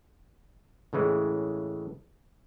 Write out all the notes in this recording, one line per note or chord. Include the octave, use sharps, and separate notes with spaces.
A2 C#3 E3 G#3